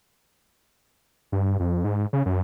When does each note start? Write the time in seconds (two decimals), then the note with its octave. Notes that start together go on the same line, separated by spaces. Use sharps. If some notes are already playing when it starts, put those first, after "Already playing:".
1.32 G2
1.60 F2
1.84 G#2
2.13 C#3
2.26 F#2